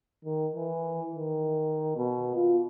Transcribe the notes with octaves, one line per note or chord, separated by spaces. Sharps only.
D#3
E3
D#3
B2
F4